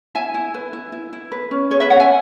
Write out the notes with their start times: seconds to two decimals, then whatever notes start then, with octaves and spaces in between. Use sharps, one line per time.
0.15 E4 E5 G#5
0.34 E4
0.54 B4
0.73 E4
0.92 E4
1.13 E4
1.32 B4
1.51 C#4
1.71 G#4 C#5
1.80 B4 E5
1.90 C#4 C#5 F#5
2.00 E5 G#5